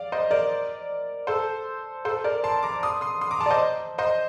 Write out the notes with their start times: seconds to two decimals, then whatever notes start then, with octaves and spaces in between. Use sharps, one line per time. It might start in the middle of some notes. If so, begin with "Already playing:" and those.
Already playing: D5 F5
0.12 C5 D#5
0.30 A#4 D5
1.27 A4 C5
2.05 A4 C5
2.24 A#4 D5
2.44 A5 C6
2.63 A#5 D6
2.83 C6 D#6
3.01 C6 D#6
3.21 C6 D#6
3.31 A#5 D6
3.40 A5 C6
3.46 D5
3.50 C5 D#5
3.98 C5 D#5